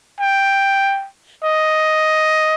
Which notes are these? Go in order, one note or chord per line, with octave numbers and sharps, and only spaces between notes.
G5
D#5